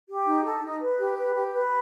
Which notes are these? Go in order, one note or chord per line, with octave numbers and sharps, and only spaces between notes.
G4
D#4
A4
D#4
B4
G4
B4
G4
B4